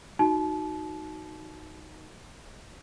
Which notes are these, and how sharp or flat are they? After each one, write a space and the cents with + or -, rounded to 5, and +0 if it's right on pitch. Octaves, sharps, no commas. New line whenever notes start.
D#4 +0 F#4 +0 A5 -35